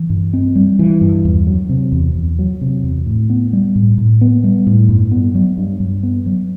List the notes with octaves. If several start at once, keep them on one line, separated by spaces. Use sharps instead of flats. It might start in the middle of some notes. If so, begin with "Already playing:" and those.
Already playing: E3
G2
C4
G3
E3
G2
E2
F#3
C3
E2
E2
F#3
C3
E2
A2
B3
G3
A2
A2
B3
G3
A2
G2
B3
F#3
G2
G2
B3
F#3